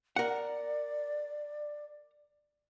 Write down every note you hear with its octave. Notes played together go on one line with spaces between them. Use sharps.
A#4 D5 F#5